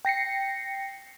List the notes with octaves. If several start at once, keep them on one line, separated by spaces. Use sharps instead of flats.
G5 A#6 C7 C#7